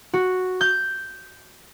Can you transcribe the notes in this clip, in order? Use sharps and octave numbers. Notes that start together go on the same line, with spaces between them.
F#4
G6